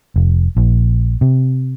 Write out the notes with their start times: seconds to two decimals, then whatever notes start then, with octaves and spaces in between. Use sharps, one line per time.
0.16 F1
0.56 A#1
1.21 C3